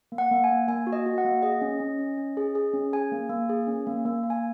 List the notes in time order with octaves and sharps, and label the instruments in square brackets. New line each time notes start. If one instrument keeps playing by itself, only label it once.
[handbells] A#3
F#5
A#3
G#5
A#3
A#3 G#5
F#4
D#5
F#4
F#5
A#3
G#4 D#5
C#4
C#4
C#4
C#4
G#4
G#4
C#4
G#4 G#5
A#3
A#3
G#4
C#4
A#3
A#3
A#3
G#5